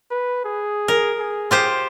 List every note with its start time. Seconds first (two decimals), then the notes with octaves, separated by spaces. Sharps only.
0.11 B4
0.45 G#4
0.88 A#4
1.20 G#4
1.51 F4 G4 C5